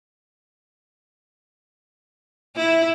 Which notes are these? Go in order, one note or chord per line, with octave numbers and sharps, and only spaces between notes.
E4